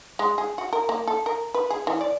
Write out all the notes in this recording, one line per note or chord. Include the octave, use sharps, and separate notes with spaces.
G#3
G#4
F#4
A#4
A#3
A4
A#4
B4
G#4
E3
D5